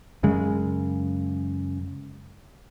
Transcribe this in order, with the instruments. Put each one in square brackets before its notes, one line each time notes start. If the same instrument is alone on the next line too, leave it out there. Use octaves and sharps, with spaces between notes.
[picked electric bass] F#2 C#3 G#3